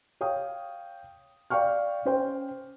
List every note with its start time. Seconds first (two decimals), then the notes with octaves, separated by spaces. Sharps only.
0.21 C#5 F5 G5 D#6
1.50 D5 F5 G5 C#6 F6
2.05 C#4 C5 G5